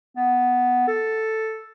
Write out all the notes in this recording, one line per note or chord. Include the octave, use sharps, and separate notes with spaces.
B3
A4